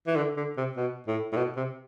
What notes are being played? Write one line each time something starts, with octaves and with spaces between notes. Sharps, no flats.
E3
D3
D3
C3
B2
A2
A2
B2
C3